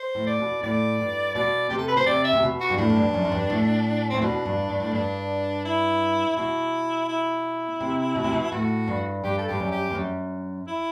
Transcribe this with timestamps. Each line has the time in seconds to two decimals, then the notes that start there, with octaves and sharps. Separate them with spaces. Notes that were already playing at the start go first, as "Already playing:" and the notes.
Already playing: C5
0.15 A2
0.27 D5
0.39 B2
0.63 A2 D5
0.99 G2
1.35 B2 D5
1.70 C3 G4
1.78 A4
1.88 B4
1.96 B2 C5
2.06 C3 D5
2.24 E5
2.33 C3
2.43 B2
2.61 F#4
2.70 G2
2.78 A2 D4
2.90 A2
2.96 G2
3.10 G2
3.14 F#2
3.25 F#2
3.32 G2
3.50 A2
4.10 A2 C4
4.22 B2 D4
4.45 G2
4.69 G2
4.80 A2
4.92 G2 D4
5.65 E4
6.37 B2 E4
7.08 E4
7.80 C3
8.16 B2
8.24 C3
8.33 B2
8.52 A2 F#4
8.88 G2
9.24 G2 G4
9.38 A4
9.48 G2 G4
9.60 F#2
9.72 G4
9.90 E2
9.95 F#2
10.68 E4